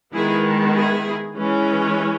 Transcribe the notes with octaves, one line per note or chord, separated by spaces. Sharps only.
D#3 G#3 B3 E4 G#4
E4 G#4
E3 G#3 C#4